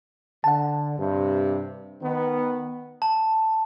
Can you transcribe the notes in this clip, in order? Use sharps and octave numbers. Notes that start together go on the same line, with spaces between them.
D3 F#5 A5
G2 C3
D#3 B3
A5